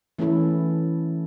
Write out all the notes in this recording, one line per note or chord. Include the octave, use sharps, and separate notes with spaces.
E3 A3 C#4 E4 A4